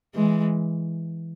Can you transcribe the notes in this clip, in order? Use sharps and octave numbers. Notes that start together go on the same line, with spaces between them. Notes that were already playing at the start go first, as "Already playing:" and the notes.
E3 G#3